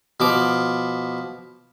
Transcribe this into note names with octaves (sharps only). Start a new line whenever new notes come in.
B2 F3 D6